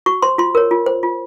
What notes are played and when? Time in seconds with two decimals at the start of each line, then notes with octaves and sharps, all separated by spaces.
0.06 F#4 C#6
0.22 C5 C6
0.38 F4 C6
0.55 A#4 C#5
0.71 F4
0.86 C5
1.03 F4